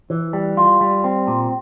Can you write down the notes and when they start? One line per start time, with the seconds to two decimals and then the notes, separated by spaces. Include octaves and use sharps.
0.10 E3
0.33 G3
0.57 F4
0.81 G3
1.04 C4
1.27 A#2